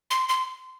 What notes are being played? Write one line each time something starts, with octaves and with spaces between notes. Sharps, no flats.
C6
C6